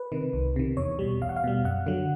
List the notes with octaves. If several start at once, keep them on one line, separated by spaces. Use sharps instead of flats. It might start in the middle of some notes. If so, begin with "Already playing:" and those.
Already playing: B4
C3 D#3
C2
C3 D#3
E2 C#5
B2 G3
E2 F5
F#5
F5
B2 G3
F#2 F#5
D3 F#3